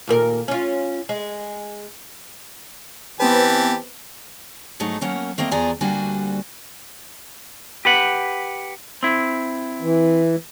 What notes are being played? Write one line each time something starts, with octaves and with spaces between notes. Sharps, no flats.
D#2 A#2 A#4
C#4 F4
G#3
E3 B3 C4 G4 B4 A5
G#2 F#3 A3 D#4
F#3 A#3 C#4 A#4 F#5
A3 A#3 C4 D#5
E2 F3 G#4 D5 G#5 A#5
D2 G3 A#3 D4 F#4 G#5
G4 B4 F#5
C4 E4
E3